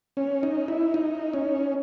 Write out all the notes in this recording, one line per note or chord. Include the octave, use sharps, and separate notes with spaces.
C#4
D#4
E4
D#4
C#4